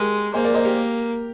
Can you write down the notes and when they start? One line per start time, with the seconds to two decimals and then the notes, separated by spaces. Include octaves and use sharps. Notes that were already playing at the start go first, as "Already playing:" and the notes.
Already playing: G#3 G4 A#4
0.34 A#3 G#4 C5
0.45 A#4 D5
0.54 C5 D#5
0.65 G4 A#4